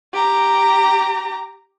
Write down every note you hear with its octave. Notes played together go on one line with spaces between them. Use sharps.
G4 A#5